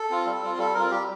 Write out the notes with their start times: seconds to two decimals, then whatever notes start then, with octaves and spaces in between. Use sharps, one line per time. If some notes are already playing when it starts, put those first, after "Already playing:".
Already playing: A4
0.10 C4 F4
0.26 G3
0.43 C4 F4
0.58 G3 A4
0.74 C4 F4 A#4
0.91 G3 G4